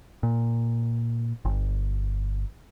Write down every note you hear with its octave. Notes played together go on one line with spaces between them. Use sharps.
A#2
G1